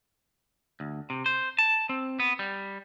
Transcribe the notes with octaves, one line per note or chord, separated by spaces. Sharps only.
D2
C3
C5
A5
C4
B3
G3